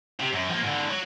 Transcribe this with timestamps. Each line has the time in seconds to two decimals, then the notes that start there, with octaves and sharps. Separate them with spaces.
0.20 C3
0.33 F#2
0.50 F3 A#3
0.63 G#2 D3
0.90 F#3